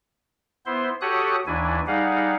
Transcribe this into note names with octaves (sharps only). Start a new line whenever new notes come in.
B3 E4 C5 C6
F#4 G4 A4 C#5 D#6 F#6
D#2 E3 D4 E4 G#5
G3 D#4 G#4 F5 F#5